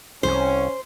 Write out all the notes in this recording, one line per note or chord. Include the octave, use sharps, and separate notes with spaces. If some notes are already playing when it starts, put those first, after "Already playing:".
C2 C#4 C5